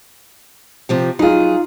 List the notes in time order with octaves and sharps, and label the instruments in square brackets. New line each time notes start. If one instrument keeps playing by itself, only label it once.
[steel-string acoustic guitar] C3 F3 G4
[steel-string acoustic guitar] F#3 G#4 [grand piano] D#4 F4